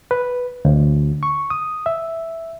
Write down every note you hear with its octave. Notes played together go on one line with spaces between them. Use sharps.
B4
D2
C#6
D#6
E5